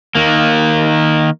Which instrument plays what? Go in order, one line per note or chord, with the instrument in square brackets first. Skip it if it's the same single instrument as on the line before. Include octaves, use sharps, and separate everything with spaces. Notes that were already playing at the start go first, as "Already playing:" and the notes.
[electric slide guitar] D#3 A#3